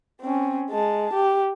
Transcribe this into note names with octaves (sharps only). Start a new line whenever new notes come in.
C4 C#4
G#3 A5
G4